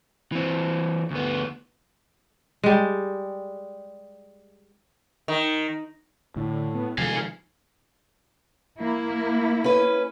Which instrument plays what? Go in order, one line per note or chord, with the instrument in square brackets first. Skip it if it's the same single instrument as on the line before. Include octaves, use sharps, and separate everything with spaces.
[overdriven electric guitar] E3 C4
D2 B3
[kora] G3 G#3
[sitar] D#3
[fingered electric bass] A2 [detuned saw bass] D3
[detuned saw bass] B3
[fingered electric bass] C3 F3 G#3 [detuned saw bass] D#3 [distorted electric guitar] F5 G#5
[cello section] A#3 E4
[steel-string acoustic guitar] C#4 B4